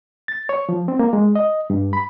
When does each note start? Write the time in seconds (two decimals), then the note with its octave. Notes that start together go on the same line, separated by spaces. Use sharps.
0.28 A6
0.49 C#5
0.69 F3
0.88 C4
0.99 A#3
1.13 G#3
1.35 D#5
1.70 G2
1.93 B5